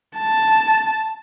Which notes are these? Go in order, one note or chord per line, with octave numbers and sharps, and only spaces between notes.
A5